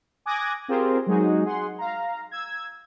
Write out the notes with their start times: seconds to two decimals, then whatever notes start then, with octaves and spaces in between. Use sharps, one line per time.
0.26 G#5 D6 D#6 F#6 G#6 A#6
0.68 C4 F4 G4 G#4 A#4 C5
1.07 F#3 G#3 D#4 F#4 G#4
1.46 G#4 F#5 C6
1.78 F5 A#5
2.31 E6 G#6